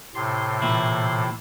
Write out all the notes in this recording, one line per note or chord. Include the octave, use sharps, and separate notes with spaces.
A2 C3 C6
A#2 E3 E4